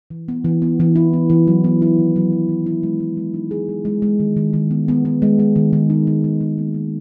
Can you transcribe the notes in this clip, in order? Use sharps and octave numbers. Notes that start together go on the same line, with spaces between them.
E3
B3
E3
B3
E3
E4
B3
E3
F#3
B3
E4
D#3
F#3
F#3
F#3
E4
G#3
G#3
G#3
D#4
G#4
G#3
G#3
G#3
D#3
D#3
D#3
B3
B3
B3
G#3
G#3
D#3
D#3
D#4
D#3
D#3
D#3
A#3
A#3